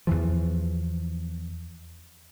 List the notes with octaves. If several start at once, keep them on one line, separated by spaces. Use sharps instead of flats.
E2 E3 F3